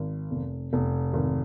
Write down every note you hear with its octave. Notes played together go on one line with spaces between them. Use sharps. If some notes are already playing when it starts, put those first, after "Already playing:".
Already playing: G#1
F1
F1
G#1